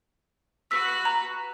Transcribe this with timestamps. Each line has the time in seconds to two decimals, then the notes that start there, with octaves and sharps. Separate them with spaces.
0.71 F#4 B4 E6 B6
1.05 A#5